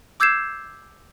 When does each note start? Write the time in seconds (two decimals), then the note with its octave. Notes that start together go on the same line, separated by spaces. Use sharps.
0.20 D6 E6 G6 G#6 C7 E7